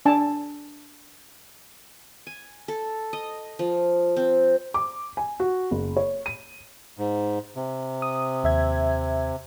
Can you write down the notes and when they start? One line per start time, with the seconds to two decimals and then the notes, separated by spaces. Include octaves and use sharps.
0.06 D4 G#5 A5
2.27 G#5
2.68 A4
3.13 D#5
3.59 F3
4.16 C4
4.74 D6
5.17 G#5
5.40 F#4
5.71 F#1
5.97 C#5
6.26 D#7
6.98 G#2
7.56 C3
8.02 D#6
8.44 D#2 E5 G#6